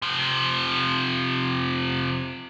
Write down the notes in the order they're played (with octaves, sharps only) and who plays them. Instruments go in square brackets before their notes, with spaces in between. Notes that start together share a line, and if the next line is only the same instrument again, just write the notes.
[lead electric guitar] C3 F3